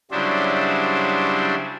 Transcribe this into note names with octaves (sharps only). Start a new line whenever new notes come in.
C#3 F#3 G3 D4 E4 C5